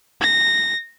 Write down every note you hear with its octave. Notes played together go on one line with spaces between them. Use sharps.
A#6